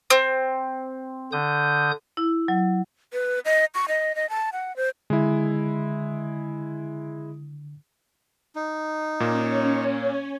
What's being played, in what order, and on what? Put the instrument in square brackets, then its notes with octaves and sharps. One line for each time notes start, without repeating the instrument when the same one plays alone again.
[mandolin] C4
[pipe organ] D3 D#6 G6
[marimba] E4
F#3
[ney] B4
D#5
C#6
D#5
D#5
A5
F#5
C5
[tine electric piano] D3 [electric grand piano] G#3 E4
[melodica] D#4
[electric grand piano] A#2 A#3 [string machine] C#4 C#5